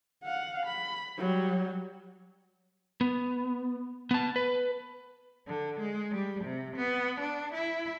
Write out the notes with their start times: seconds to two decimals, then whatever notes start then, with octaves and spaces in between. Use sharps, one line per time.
0.24 F5 F#5
0.66 B5
1.17 F#3 G3
3.01 B3
4.11 B3 A5
4.36 B4
5.48 D3
5.80 G#3
6.12 G3
6.45 C3
6.76 B3
7.20 D4
7.54 E4